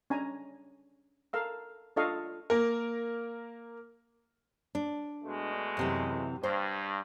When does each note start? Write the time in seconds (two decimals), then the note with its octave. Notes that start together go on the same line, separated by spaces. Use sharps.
0.10 C#4 D4 G#5 A#5
1.33 A4 A#4 F5 E6
1.96 D4 F4 A4 D#5 F5 C#6
2.50 A#3 A#4
4.75 D4
5.24 B2 G#3 A3
5.77 F#2 C3 E3
6.43 G2 C5